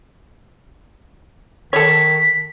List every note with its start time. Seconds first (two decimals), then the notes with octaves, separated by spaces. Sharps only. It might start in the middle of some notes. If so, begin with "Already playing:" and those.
1.73 D#3 A4 C#5 B6